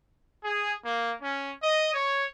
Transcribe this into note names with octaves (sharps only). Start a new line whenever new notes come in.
G#4
A#3
C#4
D#5
C#5